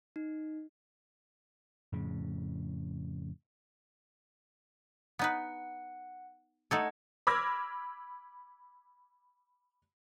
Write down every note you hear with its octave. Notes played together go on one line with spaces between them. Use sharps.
D#4
F2 A2 C#3
B3 D#4 B4 F#5
A3 D#4 A4 D#5 F#5 G#6
B5 D6 E6 F6 G#6 A#6